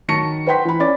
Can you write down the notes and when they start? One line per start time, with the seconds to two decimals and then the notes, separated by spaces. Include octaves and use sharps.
0.08 D#3 F#3 A5 C#6 A#6 C#7
0.46 B4 C5 F#5 G5 C6 B6
0.65 E3 B5
0.80 C#4 D5 D6 A6